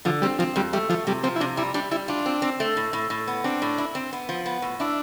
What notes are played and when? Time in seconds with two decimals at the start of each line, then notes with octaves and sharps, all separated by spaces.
0.05 D3 F3
0.22 G3 C4
0.39 F3 C4
0.56 F2 G3
0.73 G3 A3
0.90 F3 A3
1.07 C3 G3
1.23 F3 C4
1.36 E4
1.40 C3 D4
1.57 G3 E4
1.74 G3 D4
1.91 G3 E4
2.08 D4 F4
2.26 C4
2.42 C4
2.60 A3
2.77 A2
2.93 A2
3.10 A2
3.27 B3
3.44 C4 D4
3.62 A2
3.78 E4
3.95 C4
4.13 B3
4.29 F3
4.46 B3
4.62 A2
4.80 D4 E4